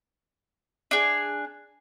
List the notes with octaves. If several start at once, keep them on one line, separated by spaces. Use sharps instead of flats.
D4 G#4